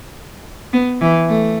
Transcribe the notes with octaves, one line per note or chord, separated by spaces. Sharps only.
B3
E3
A3